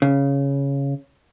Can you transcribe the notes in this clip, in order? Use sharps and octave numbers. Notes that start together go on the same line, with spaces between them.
C#3